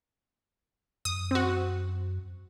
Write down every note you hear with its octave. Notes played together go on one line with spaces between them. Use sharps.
F#2 D#6
C4 F#4